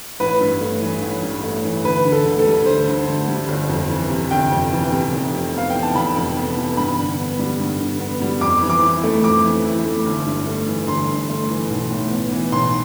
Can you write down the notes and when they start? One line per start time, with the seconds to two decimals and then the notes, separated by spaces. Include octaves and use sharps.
0.20 A1 B4
0.41 G2
0.61 A3
0.82 E3
1.02 A1
1.22 G2
1.43 A3
1.64 E3
1.84 D2 B4
2.05 D3
2.12 A4
2.25 D2
2.39 A4
2.46 G3
2.66 D2 C5
2.88 D3
3.08 D2
3.28 G3
3.48 G1
3.69 F2
3.90 E3
4.10 C3
4.31 G1 G5
4.51 F2
4.72 E3
4.93 C3
5.13 F1
5.33 F2
5.54 B3 F5
5.70 E3 G5
5.83 A5
5.95 F1 B5
6.16 F2
6.36 B3
6.57 E3
6.77 G2 B5
6.98 D3
7.18 B3
7.39 G3
7.60 G2
7.80 D3
8.00 B3
8.21 G3
8.41 F2 D6
8.62 E3
8.70 D6
8.83 E4
9.04 A3
9.23 F2 D6
9.45 E3
9.65 E4
9.86 A3
10.05 G1
10.26 G2
10.47 A3
10.67 E3
10.88 G1 C6
11.08 G2
11.29 A3
11.50 E3
11.70 B1
11.91 A2
12.11 B3
12.32 E3
12.52 B1 C6